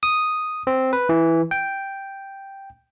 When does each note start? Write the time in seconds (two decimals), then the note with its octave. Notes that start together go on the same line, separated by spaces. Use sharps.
0.03 D#6
0.67 C4
0.93 B4
1.09 E3
1.51 G5